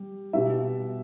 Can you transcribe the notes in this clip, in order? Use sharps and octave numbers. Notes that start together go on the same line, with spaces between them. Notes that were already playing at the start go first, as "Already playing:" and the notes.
Already playing: G3
B2 G3 E5